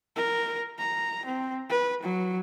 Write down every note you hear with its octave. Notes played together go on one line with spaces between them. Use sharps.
A#4
A#5
C4
B4
F#3